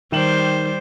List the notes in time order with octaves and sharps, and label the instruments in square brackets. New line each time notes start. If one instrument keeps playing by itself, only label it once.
[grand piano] D#3 E7 F#7 [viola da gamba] G3 C5